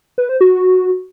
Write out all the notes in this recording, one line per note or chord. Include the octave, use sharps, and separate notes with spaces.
B4
C5
F#4